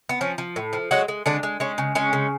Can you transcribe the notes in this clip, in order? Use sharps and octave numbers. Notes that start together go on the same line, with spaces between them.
B3
F3 C#4
F3
A2
F3
F#3 G#3 F#4
G#3
D3 G#3 D4
G#3
G#3 C#4
C#3
G#3 C#4
C#3